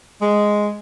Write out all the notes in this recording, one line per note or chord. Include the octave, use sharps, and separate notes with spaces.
G#3